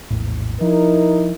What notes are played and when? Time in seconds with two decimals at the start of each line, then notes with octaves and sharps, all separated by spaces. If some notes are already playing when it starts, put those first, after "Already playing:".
0.10 A#1 E2 A2
0.61 F3 D#4 E4 A#4